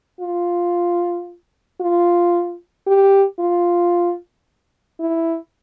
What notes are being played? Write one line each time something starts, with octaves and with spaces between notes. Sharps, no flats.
F4
F4
G4
F4
E4